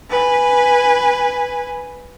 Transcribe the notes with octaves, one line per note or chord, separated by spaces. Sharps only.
B4 G#5